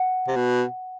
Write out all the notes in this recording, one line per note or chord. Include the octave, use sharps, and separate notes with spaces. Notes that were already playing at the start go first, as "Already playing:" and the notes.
Already playing: F#5
C3
B2